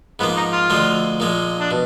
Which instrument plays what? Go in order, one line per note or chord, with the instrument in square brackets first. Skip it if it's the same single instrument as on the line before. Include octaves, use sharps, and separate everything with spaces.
[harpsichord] G#2 F3 A#3 [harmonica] B3
[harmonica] D#4
F4
[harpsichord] D2 D3 F3 G#3
A#2 F3 G#3
[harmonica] D4
[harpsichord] B2